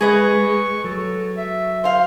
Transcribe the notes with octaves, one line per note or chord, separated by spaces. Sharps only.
G#3 G#4 B4 D#5 C#6
F#3 A4
E5
C5 F5 C6